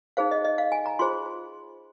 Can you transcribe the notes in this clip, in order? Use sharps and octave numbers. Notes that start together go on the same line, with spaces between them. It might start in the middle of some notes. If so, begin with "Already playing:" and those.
D#4 G#4 C5 F5
D#5
D#5
F5
G#5
A#5
F4 G#4 C5 C6